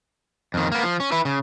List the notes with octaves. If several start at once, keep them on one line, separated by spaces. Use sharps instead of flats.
F2 D#3
A#3 B3
F3
C#4
E4 B4
C#3